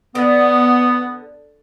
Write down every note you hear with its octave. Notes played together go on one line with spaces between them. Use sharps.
D3 B3